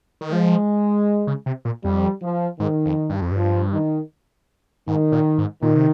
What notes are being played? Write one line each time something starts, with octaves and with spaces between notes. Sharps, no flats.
D#3
F3 G#3
C#3
C3
A#2
F2 G3
F3
G#2 D#3
F2
G2
F2
G2 F3
D#3
G#2 D#3
A#2
G#2
A#2 D#3
C3